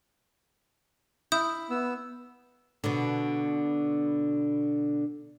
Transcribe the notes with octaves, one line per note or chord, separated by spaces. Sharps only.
E4 D#6 G6
B3 E6
B2 D3